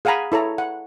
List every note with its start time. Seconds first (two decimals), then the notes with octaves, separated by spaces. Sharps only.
0.05 G#4 F5 F#5 G#5 A#5 B5
0.32 E4 A4 C#5 A#5
0.58 F#5